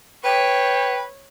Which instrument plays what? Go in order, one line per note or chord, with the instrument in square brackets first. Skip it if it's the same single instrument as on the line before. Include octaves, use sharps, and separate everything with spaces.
[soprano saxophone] B4 [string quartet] C#5 [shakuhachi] G5